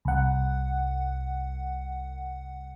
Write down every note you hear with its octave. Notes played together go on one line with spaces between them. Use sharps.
C2 F#5